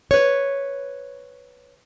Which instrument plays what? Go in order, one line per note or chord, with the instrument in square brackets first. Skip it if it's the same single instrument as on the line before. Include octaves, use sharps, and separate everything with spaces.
[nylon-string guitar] B4 C#5